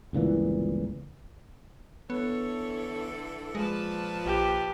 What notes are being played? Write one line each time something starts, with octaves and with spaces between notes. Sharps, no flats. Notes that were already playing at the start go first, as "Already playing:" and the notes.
G1 C#2 A#2 E3
D3 E3 B3 A4 C#5
A#2 F3 G#3 B4 A5
A#1 G4